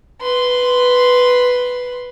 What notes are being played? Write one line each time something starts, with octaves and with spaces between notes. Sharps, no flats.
B4 C6